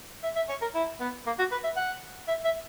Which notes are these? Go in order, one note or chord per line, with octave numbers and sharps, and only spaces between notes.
E5
E5
C#5
A#4
E4
B3
A#3
F#4
B4
E5
F#5
E5
E5